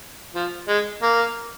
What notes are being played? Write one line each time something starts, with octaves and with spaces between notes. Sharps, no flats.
F3
G#3
A#3